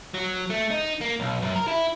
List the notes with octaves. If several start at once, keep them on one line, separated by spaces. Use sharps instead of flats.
F#3
A3
D#4
A#3
B1
F#2
A#4
E4